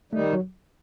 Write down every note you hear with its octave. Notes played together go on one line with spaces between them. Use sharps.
D#3 G3 A3 D#4
F#3